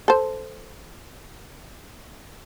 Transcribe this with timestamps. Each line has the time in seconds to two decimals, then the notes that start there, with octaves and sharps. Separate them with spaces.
0.08 A4 C5